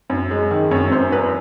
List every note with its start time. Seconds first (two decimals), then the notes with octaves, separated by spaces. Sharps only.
0.10 F#2
0.31 G#3
0.51 D#3
0.71 F#2 C#5
0.91 F#2 C5
1.12 E2 B4